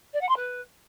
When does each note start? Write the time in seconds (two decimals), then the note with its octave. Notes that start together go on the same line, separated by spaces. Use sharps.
0.13 D5
0.21 F#5
0.29 C6
0.36 B4